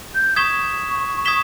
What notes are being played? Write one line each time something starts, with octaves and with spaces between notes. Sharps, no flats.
G6
C#6 D#6 G#6 B6 E7 G7
D#6 G#6 B6 E7 G7